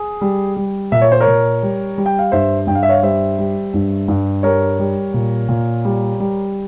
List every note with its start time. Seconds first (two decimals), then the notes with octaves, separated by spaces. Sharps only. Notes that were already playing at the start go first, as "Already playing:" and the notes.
Already playing: G#4
0.21 G3
0.56 G3
0.92 A#2 E5
1.02 C#5
1.12 C5
1.20 A#4 C#5
1.27 A#2
1.63 G3
1.98 G3
2.06 G5
2.19 F5
2.32 G2 C5 E5
2.67 G2 G5
2.75 F5
2.83 E5
2.89 C#5 F5
3.03 G3 C5 E5
3.38 G3
3.74 G2
4.08 G2
4.43 G3 A#4 C#5
4.79 G3
5.14 A#2
5.49 A#2
5.85 G3
6.20 G3